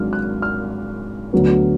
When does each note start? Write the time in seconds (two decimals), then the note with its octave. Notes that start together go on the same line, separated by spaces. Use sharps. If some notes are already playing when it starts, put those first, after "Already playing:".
Already playing: G#1 G#2 F#3 D4 F6
0.13 F#6
0.42 F6
1.33 D2 D3 F#3 B3